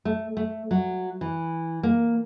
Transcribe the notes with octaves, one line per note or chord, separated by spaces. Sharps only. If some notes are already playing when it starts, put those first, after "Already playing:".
A3
A3
F#3
E3
A#3